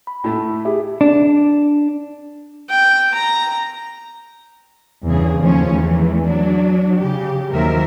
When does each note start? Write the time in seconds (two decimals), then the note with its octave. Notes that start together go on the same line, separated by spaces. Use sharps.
0.07 B5
0.24 A2 A3
0.65 G4 G#4 E5
1.01 D4
2.70 G5
3.14 A#5
5.06 E2 G2 C#3 G#4
5.41 D#2 F3 A3 C#4
5.73 E2 E3 A3
6.27 F#3 D4
6.99 C#3 G4
7.50 D#2 D#3 F3 F#3 A#4 E5